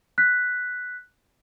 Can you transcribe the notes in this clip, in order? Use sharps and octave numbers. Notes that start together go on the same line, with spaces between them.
F#6 B6